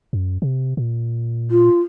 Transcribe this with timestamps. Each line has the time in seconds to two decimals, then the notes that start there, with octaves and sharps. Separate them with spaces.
0.13 F#2
0.42 C3
0.77 A#2
1.51 F4